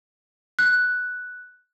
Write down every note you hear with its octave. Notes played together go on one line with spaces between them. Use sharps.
F#6